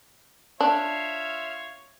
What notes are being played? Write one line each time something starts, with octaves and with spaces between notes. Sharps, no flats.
D4 F4 C#5 E5